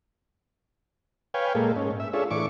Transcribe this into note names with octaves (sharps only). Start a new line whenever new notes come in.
B4 C#5 F5 G5 G#5
A#2 G#3 A#3 A4
G#2 C#4
E5
D4 F4 G#4 A4 C#5 E5
A2 E3 D4 C#6 D6